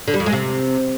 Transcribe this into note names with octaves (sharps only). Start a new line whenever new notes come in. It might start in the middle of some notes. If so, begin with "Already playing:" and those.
D3
G3
F2
G#3
C3